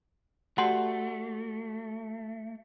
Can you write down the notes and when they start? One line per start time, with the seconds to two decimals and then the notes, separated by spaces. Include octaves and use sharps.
0.58 A3 F#4 G4 D5 F#5 A5 C6